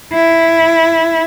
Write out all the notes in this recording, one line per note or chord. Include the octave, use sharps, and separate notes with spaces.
E4